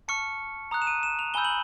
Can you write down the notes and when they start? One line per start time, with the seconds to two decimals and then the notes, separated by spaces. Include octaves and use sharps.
0.08 A5 C#6 F6 C#7
0.71 A#5 D#6 F#6
0.82 E7
0.87 D#7
1.03 E7
1.19 F7
1.34 G#5 B5 E6 G6 G7
1.45 F#7